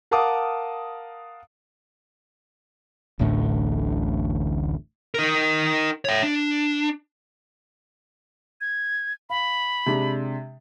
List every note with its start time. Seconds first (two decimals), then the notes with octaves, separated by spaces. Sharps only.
0.11 A#4 F5 F#5 A5 D6 D#6
3.19 D1 A1 A2 D3
5.14 D#4 A#4
6.05 C#5 E5
6.23 D4
8.61 G#6
9.30 F5 B5
9.86 C3 G#3 D4